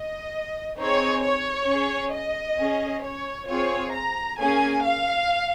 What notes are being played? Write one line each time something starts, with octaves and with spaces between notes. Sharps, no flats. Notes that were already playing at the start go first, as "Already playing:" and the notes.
Already playing: D#5
C4 D#4 G#4 C#5
C#5
C#4 G#4
D#5
C#4 G#4
C#5
C4 F4 G#4 C#5
A#5
A#3 C#4 G#4 G#5
F5